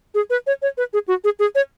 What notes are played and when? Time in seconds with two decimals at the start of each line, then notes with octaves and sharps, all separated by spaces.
0.15 G#4
0.30 B4
0.47 C#5
0.62 C#5
0.77 B4
0.93 G#4
1.08 F#4
1.24 G#4
1.39 G#4
1.55 C#5